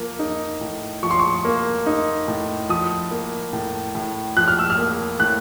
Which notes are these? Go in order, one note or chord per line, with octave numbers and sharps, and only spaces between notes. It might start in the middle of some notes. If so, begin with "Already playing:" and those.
Already playing: F3 A#3
D#4
A2
F3 C#6
C6
C#6
A#3
D#4
A2
F3 D#6
A#3
A2
A2
F3 F#6
F6
E6
F6
A#3
A2 F#6